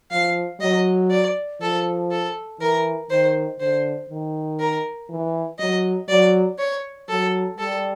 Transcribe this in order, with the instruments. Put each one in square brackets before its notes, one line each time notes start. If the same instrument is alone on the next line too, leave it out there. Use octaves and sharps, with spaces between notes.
[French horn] F3 [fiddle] F5
[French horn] F#3 [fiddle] D#5
[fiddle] D5
[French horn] F3 [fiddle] A4
[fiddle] A4
[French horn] E3 [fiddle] A#4
[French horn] D#3 [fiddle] C5
[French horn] D3 [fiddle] C5
[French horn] D#3
[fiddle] A#4
[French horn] E3
[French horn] F#3 [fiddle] D#5
[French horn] F#3 [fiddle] D5
[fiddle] C#5
[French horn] F#3 [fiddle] A4
[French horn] G3 [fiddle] A4